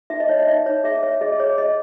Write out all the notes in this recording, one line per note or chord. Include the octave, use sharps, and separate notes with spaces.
D#4 E5
D#5
D#4 C#5
D#5
D#4 E5
D#4 C#5
G#4 E5
C#5 E5
G#4 D#5
G#4 C#5
G#4 D#5